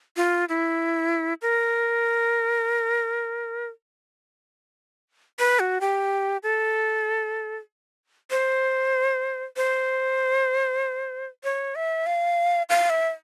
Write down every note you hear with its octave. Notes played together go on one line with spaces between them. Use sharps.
F4
E4
A#4
B4
F#4
G4
A4
C5
C5
C#5
E5
F5
F5
E5